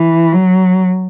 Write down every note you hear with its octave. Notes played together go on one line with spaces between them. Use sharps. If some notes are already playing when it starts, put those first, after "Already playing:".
Already playing: E3
F#3